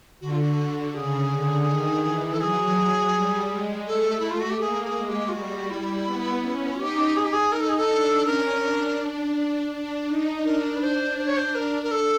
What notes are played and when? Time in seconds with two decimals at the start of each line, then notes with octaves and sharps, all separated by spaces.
0.21 D3 F#4
0.31 F4
0.41 F#4
0.94 C#3 G#4
1.31 D3
1.67 D#3
2.04 E3
2.33 A4
2.40 F#3 G#4
3.14 G3
3.50 G#3
3.87 A3 A4
4.20 E4
4.30 F4
4.40 F#4
4.50 G4
4.60 A#3 G#4
4.84 G#4
4.96 G#3
5.09 G4
5.29 F4
5.33 G3 F#4
5.70 E4
6.06 B3
6.42 C#4
6.79 D#4 G4
7.16 G#4
7.24 G4
7.33 G#4
7.52 D#4 A#4
7.61 A4
7.69 G#4
7.77 A4
7.90 D4
8.26 C#4 A#4
8.62 D4
9.73 D4
10.08 D#4
10.45 D4 A#4
10.76 B4
10.82 C5
11.18 C5
11.27 C#5
11.37 C5
11.55 A#4
11.83 A#4
11.91 A4